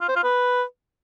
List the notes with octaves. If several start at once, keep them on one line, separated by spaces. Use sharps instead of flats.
F4
C5
F4
B4